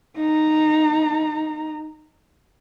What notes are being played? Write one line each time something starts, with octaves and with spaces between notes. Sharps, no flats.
D#4 A#5